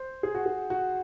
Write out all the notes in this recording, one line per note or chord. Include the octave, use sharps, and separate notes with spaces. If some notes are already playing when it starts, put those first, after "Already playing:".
Already playing: C5
G#4
F#4
G#4
F#4